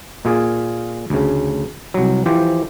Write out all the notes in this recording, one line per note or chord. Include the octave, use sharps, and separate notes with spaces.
A#2 F4 G#4
D2 C#3
C2 F#3
E3 F3 G4 C5